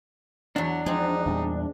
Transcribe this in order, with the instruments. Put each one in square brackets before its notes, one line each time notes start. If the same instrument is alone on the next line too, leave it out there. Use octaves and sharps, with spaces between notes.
[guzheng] E2 F#4 [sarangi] F#3 [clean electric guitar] D4
[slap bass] F3 [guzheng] G#3 C4 [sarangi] D#4
[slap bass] E2 A#2 G3